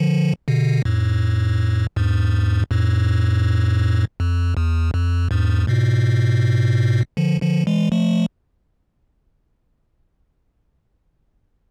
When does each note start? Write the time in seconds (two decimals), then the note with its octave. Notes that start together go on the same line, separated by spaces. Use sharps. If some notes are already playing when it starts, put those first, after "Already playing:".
Already playing: D3 F3
0.48 B2 D3
0.85 F2 A2
1.96 E2 G#2
2.71 F2 A2
4.20 F2
4.57 E2
4.94 F2
5.31 E2 G#2
5.68 G#2 B2
7.17 D3 F3
7.42 D3 F3
7.67 E3 G#3
7.92 F3 A3